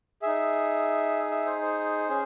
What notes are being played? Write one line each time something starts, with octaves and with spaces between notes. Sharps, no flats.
D#4 G#4 E5
E5
C5
C5
C#4 G#4